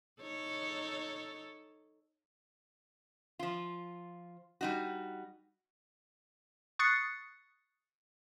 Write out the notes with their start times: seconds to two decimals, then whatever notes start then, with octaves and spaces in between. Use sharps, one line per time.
0.22 D#4 A4 C#5
3.39 F3 F4
4.61 G3 D#4 F#4
6.79 C#6 D#6 F#6 A6 C7 C#7